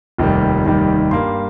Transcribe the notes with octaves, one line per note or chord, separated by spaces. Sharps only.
F1 D#2 D#3 G3
F1 D#2 D#3 G3
G2 G3 A#3 C6